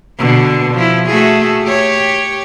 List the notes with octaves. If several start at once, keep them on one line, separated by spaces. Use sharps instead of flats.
B2 D3
F3 E4
A3 F#4 G#4
G4 C#5